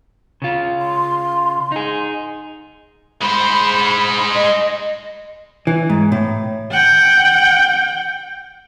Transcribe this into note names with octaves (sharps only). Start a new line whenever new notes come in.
C#3 F4
C6
D#4 G#4
G#3 C5 B5
D#5
E3
G#2
A2
F#5 G5